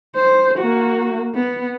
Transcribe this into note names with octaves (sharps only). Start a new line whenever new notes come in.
C5
A#3 F#4
B3